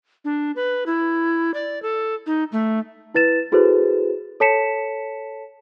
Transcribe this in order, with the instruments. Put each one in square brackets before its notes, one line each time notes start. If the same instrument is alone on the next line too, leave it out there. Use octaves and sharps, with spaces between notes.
[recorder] D4
B4
E4
D5
A4
D#4
A3
[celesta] E4 B4 A6 E7
E4 F#4 G#4 A4 B4 C5
A4 C#5 A5 B6 C#7 E7